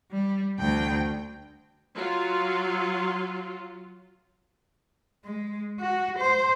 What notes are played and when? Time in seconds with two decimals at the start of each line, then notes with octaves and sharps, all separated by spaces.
0.11 G3
0.59 D2 G5
1.95 F#3 F4
5.25 G#3
5.80 F#4
6.19 C5